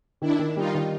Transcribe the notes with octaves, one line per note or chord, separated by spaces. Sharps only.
D#3 D4 E4
D#3
G3 D#4 F4
D#3